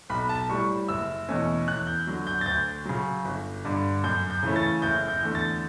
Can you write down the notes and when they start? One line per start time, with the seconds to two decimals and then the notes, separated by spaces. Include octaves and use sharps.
0.10 B1 B5
0.29 A5
0.49 A2 G3 C#6
0.88 F#1 E6
1.28 E2 B2 A3 C#4
1.68 E2 F#6
1.87 G6
2.07 D3 F#3
2.27 G6
2.41 A6
2.46 D2 G6
2.86 C#3 F#3
3.25 G1
3.65 G2 D3
4.04 F#2 G6
4.30 G6
4.43 C#3 E3 A3 C#4
4.56 A6
4.82 F#1 G6
5.08 G6
5.22 E2 D3 A3
5.35 A6